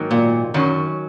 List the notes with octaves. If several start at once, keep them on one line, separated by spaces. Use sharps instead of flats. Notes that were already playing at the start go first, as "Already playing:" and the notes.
Already playing: G#2 D#3 F#3 A#3 D#4
A#2
F#2 D#3 F#3 C#4